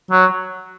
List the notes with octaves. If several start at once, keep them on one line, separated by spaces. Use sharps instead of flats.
F#3